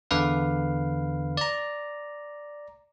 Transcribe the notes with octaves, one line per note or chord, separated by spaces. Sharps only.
E2 D3 B4 F5
D5 A#5